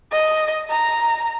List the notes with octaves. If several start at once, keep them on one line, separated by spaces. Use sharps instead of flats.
D#5
A#5